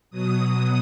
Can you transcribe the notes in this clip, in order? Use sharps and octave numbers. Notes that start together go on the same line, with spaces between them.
B2 F#3 D#6